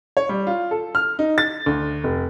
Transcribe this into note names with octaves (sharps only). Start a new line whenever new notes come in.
C#5
G3
F4
A4
F6
D#4
A6
D2
F1